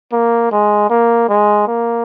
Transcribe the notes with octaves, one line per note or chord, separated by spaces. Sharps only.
A#3
G#3
A#3
G#3
A#3